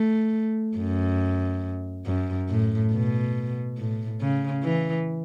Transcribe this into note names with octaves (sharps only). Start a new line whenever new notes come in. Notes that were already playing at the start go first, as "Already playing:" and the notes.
Already playing: A3
F#2
F#2
A2
B2
A2
C#3
E3